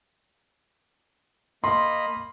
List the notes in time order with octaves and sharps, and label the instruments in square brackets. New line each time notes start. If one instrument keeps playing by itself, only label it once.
[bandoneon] A#3 D#5 B5 [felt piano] C6